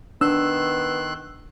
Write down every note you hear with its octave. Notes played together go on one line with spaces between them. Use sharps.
D#3 B3 D4 C6 E6 F#6